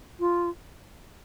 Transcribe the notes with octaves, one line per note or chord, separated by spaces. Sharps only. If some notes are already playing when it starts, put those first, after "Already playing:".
F4